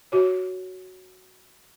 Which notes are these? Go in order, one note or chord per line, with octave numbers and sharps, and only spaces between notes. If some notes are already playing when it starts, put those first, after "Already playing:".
F#4 C#5